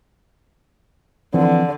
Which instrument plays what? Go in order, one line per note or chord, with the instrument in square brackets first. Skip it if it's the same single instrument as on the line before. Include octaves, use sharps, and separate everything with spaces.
[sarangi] D3 [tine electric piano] E3 F3 C4